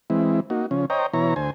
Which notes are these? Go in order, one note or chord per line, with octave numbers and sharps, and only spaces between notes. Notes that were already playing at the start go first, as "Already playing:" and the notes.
E3 G#3 C4 E4
A#3 D#4 F#4
C#3 F3 C#4
C5 C#5 D#5 G5 A#5
B2 E3 E4 C#5 A#5
D2 C5 G#5